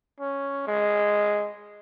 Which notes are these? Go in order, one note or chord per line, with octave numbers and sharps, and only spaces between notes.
C#4
G#3